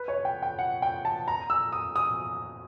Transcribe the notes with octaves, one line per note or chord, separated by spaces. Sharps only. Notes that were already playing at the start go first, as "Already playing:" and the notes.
Already playing: B4
C#5
G5
G5
F#5
G5
A5
A#5
E6
D#6
D#6